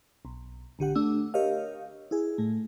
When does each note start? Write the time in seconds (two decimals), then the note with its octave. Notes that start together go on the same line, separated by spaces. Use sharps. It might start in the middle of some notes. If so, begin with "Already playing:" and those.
0.25 B1
0.79 A1 D3 G4 F#5
0.95 A3 D4 E6
1.34 G4 A#4 C#5 D#5 F5
2.11 E4 G#4
2.38 A2 A3